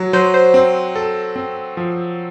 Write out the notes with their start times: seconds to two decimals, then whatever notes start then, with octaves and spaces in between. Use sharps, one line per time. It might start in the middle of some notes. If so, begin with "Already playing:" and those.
Already playing: F#3 F#4
0.13 F#3 C5
0.34 C5
0.54 C4
0.95 A4
1.36 C4
1.77 F3